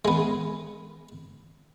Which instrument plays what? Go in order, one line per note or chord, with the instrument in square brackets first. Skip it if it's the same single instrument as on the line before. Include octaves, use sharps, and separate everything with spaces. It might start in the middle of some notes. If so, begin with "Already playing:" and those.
[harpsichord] G#3 B3